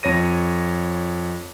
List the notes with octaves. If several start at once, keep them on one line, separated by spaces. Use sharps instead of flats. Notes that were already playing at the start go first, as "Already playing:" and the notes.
F2 C#5 A#6 D#7